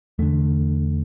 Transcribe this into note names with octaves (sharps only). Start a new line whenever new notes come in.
E2 D3 A3